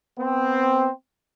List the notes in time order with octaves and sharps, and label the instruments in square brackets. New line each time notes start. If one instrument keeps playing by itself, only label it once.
[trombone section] B3 C4